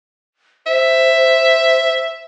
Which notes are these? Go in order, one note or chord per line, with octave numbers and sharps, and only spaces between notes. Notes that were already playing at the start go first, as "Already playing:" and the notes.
C5 E5